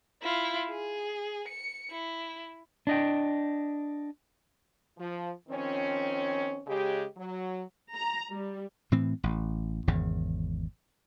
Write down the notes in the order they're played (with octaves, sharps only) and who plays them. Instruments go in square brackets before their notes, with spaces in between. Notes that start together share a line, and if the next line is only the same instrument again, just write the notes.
[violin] E4 F4
G#4
C#7
E4
[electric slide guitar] D4 D#5 G5
[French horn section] F3
D#3 F3 C4 C#4
C#3 G#3 G4
F#3
[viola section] A#5
G3
[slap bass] A2 E3 C4
A1
G#1 E2 C#3